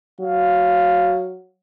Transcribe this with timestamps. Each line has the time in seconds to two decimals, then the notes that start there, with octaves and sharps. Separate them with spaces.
0.20 F#3 F5